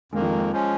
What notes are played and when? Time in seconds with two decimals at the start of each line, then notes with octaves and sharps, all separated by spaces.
0.12 F2 D#3 G#3 A#3
0.22 F3
0.31 G#3
0.52 F3 G#3 C#4